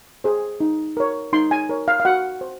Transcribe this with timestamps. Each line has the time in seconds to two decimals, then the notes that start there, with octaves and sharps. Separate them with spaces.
0.24 G#4 C5
0.60 D#4
0.97 A#4 C#5
1.33 D#4 C6
1.51 G#5
1.69 A#4 C#5
1.88 F5
2.00 F5
2.05 F#4 F#5
2.41 C5